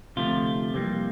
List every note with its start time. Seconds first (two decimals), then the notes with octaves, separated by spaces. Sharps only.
0.16 D2 C3 F3 A3 F4
0.74 F2 C3 E3 G3 A#3